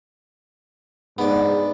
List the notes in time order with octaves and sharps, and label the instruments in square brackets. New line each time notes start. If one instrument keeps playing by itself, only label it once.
[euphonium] G#2 [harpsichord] B3 D4